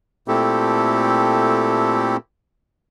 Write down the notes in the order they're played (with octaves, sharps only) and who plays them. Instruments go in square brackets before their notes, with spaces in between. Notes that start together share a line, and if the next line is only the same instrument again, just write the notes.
[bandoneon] A#2 A3 C4 E4 G4 A4